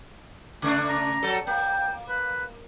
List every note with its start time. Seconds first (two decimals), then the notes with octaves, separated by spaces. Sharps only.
0.62 C#3 A3 D4
0.89 A#5
1.23 F#3 A4
1.47 A#3 G5
2.09 B4